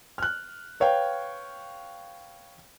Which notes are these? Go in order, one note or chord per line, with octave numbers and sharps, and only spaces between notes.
F6 F#6
B4 C#5 F5 G5